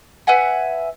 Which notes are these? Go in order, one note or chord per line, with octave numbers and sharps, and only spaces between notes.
B4 E5 F#5 G#5